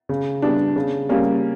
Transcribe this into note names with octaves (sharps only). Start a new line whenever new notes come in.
C#3
G3 B3 D4
C#3
G3 A#3 C#4